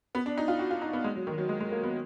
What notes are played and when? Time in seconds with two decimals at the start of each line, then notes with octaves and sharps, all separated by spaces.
0.15 B3
0.26 D4
0.38 D#4
0.48 F4
0.59 F#4
0.71 F4
0.82 D#4
0.93 B3
1.04 G#3
1.15 F#3
1.27 D#3
1.38 F#3
1.49 G#3
1.60 G#3
1.72 A#3
1.83 B3